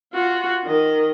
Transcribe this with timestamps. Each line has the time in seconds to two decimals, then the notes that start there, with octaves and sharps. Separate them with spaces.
0.13 F4 F#4
0.65 D#3 D#5